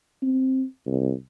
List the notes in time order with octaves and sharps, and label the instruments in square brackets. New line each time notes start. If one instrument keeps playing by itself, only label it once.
[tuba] C4
C2